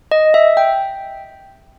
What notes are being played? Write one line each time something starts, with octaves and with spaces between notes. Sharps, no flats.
D#5
E5
G5